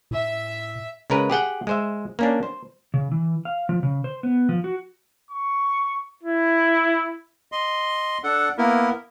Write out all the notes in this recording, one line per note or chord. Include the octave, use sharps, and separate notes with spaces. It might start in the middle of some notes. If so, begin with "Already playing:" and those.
A2 E5
C#3 G#3 A#4 B4
G4 G#4 F#5 G5
G#3 C5 E5
A#3 C#4 D4
C5
C#3
E3
F5
F3
C#3
C5
B3
F3
F#4
C#6
E4
D#5 C6
D4 A4 F#5
A#3 B3 E4 A#4